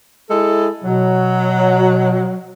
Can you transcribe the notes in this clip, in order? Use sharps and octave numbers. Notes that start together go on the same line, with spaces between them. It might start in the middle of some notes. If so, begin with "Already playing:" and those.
G#3 E4 A4
B2 F#3